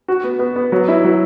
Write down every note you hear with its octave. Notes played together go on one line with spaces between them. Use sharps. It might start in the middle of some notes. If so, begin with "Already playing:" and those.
F#4
B3
B3
B3
F#3
E4
F#3